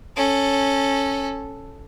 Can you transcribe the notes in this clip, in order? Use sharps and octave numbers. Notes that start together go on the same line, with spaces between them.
C#4 A4